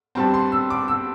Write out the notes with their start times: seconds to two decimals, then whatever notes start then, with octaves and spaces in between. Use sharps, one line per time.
0.15 G2 G3 C4 A5
0.34 C6
0.52 E6
0.70 D6
0.88 E6